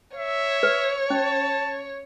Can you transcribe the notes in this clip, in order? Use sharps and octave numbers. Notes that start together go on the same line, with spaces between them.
C#5 E5
B4
C#4 A5